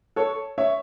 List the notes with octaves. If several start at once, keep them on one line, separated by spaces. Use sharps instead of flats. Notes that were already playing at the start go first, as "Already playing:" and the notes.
A4 C#5
C#5 E5